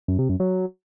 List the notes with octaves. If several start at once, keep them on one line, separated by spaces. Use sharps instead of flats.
F#2
C3
F#2
F#3